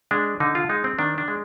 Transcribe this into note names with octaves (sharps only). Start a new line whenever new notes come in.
G#3 D4
D3 D#4
F4
G#3 D#4
C4
D#3 D4
D4
G#3